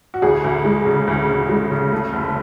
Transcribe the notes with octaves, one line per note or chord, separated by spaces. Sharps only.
F#4
D2 G#4
D2
G#3
C#3
D2
D2
G#3
C#3
A3
F#1